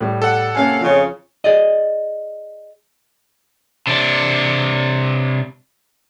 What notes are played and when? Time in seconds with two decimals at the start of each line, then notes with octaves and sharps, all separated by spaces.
0.01 A2 G3
0.22 A4 F#5
0.55 C3 A#3 C#4 F5 G#5
0.81 F2 C#3 F3
1.44 G#4 D5 D#5
3.87 C3 D4